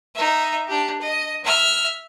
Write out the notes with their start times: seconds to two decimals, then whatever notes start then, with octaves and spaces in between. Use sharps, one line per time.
0.15 D#4 E5
0.68 D4 G4
1.01 D#5
1.44 E5 F6